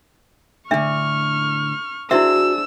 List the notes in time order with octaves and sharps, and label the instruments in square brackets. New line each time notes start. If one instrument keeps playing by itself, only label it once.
[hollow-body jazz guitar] A2 D3 [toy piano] D4 E5 [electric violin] C#6 F6
[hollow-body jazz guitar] D4 G#4 C5 [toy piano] E4 E5 [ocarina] F#4 [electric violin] E6